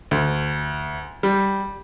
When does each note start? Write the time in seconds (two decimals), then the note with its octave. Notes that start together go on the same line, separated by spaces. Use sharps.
0.11 D2
1.23 G3